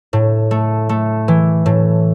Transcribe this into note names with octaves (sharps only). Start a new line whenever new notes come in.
A2
A3
A3
E3
A2